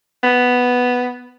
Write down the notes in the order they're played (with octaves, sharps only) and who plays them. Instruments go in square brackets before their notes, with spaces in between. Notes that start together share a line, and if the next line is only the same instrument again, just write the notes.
[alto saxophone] B3